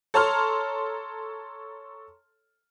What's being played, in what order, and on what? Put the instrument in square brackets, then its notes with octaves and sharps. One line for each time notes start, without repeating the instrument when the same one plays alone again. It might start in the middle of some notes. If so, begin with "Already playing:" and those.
[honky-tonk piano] A4 C#5 A5 A#5 C6 F6